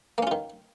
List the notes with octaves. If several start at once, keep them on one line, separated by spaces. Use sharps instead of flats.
D#3 A#3 C#4 F4